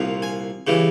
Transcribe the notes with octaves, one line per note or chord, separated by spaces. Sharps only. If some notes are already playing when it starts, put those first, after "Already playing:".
Already playing: C2 A#2 F3
G#5
C#3 E3 G3